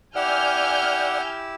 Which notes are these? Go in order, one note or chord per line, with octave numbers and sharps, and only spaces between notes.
E4 G4 D5 F#5 G#5 E6 F6 G6